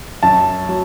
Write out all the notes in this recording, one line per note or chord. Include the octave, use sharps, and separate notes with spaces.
F#2 A5
F#3